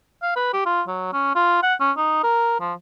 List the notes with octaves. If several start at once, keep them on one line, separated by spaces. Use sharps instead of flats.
F5
B4
G4
F4
F#3
C#4
F4
F#5
C#4
D#4
A#4
F3